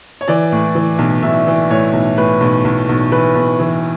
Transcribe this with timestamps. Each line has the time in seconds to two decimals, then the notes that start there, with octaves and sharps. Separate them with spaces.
0.21 C#5
0.28 E3 D5
0.52 A2
0.75 E3
0.99 B1
1.23 B1 E5
1.47 E3
1.70 A2 C#5
1.93 B1
2.17 A2 B4
2.41 B1
2.65 B1
2.89 B1
3.12 E3 B4
3.35 B1
3.60 E3